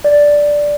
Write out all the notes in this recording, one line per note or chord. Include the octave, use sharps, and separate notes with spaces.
D5